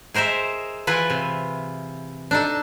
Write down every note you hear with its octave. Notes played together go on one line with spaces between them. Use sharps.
G#4 A#4 C5 D#5 E5
E3 E4 F4 B4
C3
D4 D#4 A4